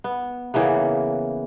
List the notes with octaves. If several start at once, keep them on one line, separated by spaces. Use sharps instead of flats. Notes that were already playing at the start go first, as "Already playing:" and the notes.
B3
C#3 E3 A#3 B3